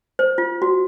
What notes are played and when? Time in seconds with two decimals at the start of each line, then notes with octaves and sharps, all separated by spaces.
0.19 C5
0.38 F4
0.62 F#4